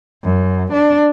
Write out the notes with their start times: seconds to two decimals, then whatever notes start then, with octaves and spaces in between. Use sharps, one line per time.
0.23 F#2
0.73 D4